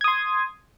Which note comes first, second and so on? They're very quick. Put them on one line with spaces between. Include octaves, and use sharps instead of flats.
G#6 D#6 C6